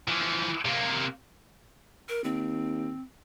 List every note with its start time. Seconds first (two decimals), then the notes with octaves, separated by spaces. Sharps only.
0.08 E3 F3
0.65 C3 A#3
2.09 A#4
2.24 D#2 C4